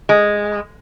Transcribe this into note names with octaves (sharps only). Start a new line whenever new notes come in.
G#3